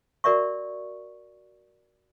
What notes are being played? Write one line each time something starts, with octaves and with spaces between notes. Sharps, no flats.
F#4 A#4 D5 E5 C#6